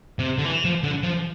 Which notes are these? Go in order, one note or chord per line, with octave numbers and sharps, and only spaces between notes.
C3
D3
E3
F3
D3
F3